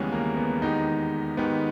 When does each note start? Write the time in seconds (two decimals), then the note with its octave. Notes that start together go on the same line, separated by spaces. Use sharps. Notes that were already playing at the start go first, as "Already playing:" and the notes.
Already playing: D#2 C#3 E3 G3 G#3 B3 C#4
0.12 A#3
0.37 B3
0.62 E2 D#3 G#3 B3 D#4 G4
1.37 G#2 D#3 G#3 B3 D#4 G4